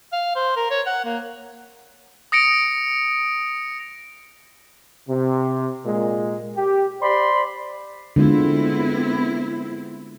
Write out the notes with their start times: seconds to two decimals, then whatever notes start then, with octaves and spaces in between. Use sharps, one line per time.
0.12 F5
0.35 C5
0.56 A#4
0.70 C#5
0.86 F#5
1.04 A#3
2.32 D#6 A#6 C#7 D7
5.09 C3
5.85 A#2 G#3
6.56 G4
7.02 C5 D5 B5 C6
8.16 D3 G#3 B3 C4 E4 F4